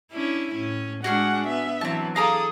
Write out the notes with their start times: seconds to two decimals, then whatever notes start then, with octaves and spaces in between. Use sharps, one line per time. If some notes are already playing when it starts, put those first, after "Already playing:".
0.12 C#4 D4 E4
0.55 A2 C#4
1.04 G#3 D4 F#4 G#4 F#5 F6
1.47 B3 E5
1.81 E3 F#3 C4 A5
2.16 G#4 A4 F5 A#5 D6 D#6